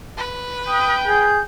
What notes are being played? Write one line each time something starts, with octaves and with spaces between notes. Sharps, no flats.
B4
G5 D#6
G#4 G6